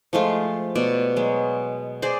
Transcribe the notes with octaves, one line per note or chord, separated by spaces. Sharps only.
F3 G#3 A3 F4
B2 D5
F#3 G#3
G#4 C5 D5